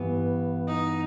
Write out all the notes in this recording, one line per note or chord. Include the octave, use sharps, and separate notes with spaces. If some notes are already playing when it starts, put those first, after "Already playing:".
Already playing: G2 E3 B3
D#4